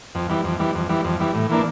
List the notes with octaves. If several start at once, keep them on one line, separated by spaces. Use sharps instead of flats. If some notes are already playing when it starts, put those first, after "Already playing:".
F2
E3 G3
F2
E3 G3
F2
E3 G3
F2
E3 G3
A2
E3 A#3 D4